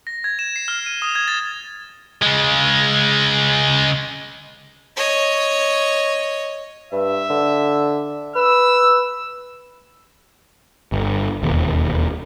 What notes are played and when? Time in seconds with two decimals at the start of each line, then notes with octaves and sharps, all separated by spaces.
0.07 A#6
0.24 G#6
0.39 E7
0.56 C7
0.68 F6
0.86 D#7
1.02 D#6
1.15 G#6
1.28 A6
2.22 C#3 G#3
4.96 C#5 D#5
6.92 G2 E5
7.30 D3
8.36 B4 E6
10.92 G1
11.43 E1 D#2